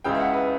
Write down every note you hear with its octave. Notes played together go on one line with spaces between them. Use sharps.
C#2 C#3 E3 G5
E5
F#5
B4